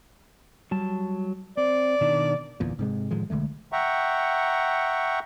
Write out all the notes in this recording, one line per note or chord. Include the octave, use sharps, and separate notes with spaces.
F#3 G3 A5
C4 D5
B2 D#3 D4
G1 E2 A#2
G#2 C3 G#3
A2 D#3 F3 G#3
B1 D3 G#3 A3
E5 F#5 G5 A#5 C#6